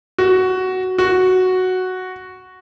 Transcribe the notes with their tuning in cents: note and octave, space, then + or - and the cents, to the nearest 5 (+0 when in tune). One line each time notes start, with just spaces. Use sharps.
F#4 +10
F#4 +0